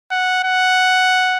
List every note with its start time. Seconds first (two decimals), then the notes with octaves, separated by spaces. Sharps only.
0.11 F#5
0.44 F#5